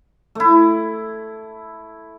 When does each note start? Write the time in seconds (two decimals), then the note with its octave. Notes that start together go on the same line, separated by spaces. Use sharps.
0.35 A3 E4